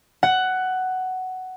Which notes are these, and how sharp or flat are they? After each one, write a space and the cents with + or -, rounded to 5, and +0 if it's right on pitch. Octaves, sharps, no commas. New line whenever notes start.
F#5 +10